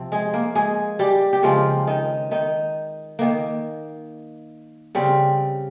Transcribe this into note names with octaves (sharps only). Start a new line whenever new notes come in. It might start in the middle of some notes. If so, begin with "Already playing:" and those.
Already playing: C3 F3 C4
G#3 G#4
A#3 A#4
G#3 G#4
G3 G4
G4
C#3 F3 G#3 C4 F4
D#3 D#4
D#3 D#4
D#3 A#3
C#3 G3 C4